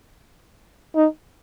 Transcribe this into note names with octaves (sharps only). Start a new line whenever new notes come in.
D#4